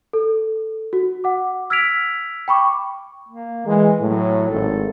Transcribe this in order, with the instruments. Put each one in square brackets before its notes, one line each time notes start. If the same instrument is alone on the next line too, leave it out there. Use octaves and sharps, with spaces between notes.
[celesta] A4
F#4
F#5 D6
E6 F6 G#6 B6 D7 F7
G5 B5 C#6 D6
[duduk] A#3
[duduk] E3 [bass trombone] G#3
[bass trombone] A2 [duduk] F#3
[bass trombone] G#1 [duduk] A4